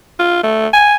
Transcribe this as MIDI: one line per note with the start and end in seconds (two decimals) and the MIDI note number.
0.19 0.44 65
0.44 0.68 57
0.73 0.96 80